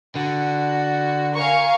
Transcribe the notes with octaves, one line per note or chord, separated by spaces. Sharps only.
D3 F#4
A#4 F5 G#5 C#6